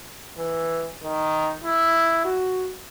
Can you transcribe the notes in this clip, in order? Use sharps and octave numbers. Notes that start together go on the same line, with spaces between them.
E3
D#3
E4
F#4